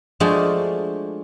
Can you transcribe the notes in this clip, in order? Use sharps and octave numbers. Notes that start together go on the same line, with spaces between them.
F3 G#3 A3 D4 F#4 G#4